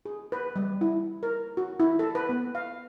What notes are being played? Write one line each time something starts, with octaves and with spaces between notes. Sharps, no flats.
G#4
B4
G3
E4
A#4
F#4
E4
A4
B4
B3
F5